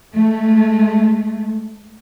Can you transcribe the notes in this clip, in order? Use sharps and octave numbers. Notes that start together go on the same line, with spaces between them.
G#3 A3